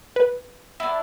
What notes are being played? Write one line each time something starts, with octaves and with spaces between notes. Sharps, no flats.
B4
D4 E4